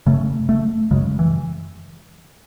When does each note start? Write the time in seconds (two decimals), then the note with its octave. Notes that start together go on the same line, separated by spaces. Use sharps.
0.06 F#2 C#3 A3
0.49 A3
0.91 F#2 C#3 G#3
1.19 E3